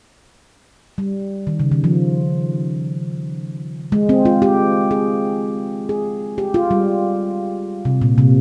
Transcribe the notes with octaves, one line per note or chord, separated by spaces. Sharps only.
G3
D#3
C#3
D#3
F3
G#3
C4
F4
G4
G#4
G#4
G4
F4
G3
C3
A#2
C3